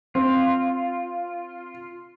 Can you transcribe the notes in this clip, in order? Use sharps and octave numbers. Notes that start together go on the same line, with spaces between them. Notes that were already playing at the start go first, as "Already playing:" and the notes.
C4 F4